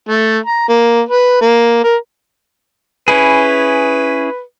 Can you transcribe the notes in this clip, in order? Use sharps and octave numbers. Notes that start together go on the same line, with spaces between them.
A3
A#5
A#3
B4
A#3
A#4
C#4 E4 G#4 B4